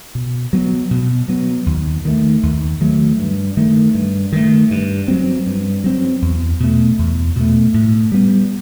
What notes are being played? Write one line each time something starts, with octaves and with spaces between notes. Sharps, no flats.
B2
F#3 B3
B2
F#3 B3
D#2
D#3 F#3 A3
D#2
D#3 F#3 A3
G2
D#3 A3
G2
D#3 A3
G2
F#3 C4
G2
F#3 C4
E2
B2 A3
E2
B2 A3
A2
G3 B3